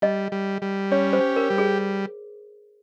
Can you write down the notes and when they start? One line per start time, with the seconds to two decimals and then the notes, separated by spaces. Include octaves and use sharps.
0.02 G3 D#5
0.32 G3
0.62 G3
0.91 C#4 C#5
1.13 C5
1.21 G4
1.36 A#4
1.50 G3
1.58 G#4